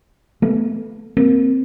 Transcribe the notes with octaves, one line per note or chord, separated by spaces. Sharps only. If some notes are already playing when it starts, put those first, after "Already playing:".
A3 B3
A#3 C4